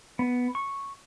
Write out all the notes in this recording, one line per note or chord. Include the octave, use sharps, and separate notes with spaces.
B3
C#6